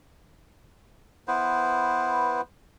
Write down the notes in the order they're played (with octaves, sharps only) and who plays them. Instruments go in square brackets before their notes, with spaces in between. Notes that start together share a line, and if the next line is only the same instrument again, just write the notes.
[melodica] B3 E4 B4 C5